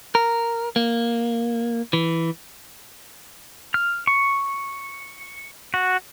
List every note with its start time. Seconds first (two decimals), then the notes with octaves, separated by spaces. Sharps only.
0.15 A#4
0.76 A#3
1.93 E3
3.74 F6
4.07 C#6
5.74 F#4